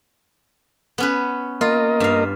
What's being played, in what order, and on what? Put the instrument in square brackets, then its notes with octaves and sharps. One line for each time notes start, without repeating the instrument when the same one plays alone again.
[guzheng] B3 C#4 B4
[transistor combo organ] A#3 A#4 D#5 [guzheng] F4
[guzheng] G2 F5